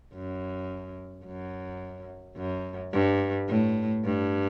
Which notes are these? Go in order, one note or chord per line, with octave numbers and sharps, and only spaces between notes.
F#2
F#2
F#2
G2
A2
G2